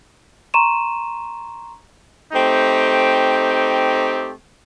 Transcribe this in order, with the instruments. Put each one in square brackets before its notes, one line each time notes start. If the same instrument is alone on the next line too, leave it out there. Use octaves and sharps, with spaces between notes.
[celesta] A#5 C6 C#6 D#7 E7
[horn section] A3 C4 D#4 G4